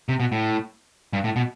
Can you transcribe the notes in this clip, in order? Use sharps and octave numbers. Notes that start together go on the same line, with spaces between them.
C3
B2
A2
G2
A2
B2